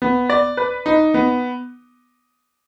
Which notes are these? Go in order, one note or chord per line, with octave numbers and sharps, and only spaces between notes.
B3
D5
B4
D#4
B3